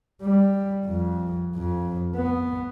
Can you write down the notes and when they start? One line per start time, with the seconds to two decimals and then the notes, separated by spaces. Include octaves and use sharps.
0.22 G3
0.86 F2
1.55 F2
2.16 B3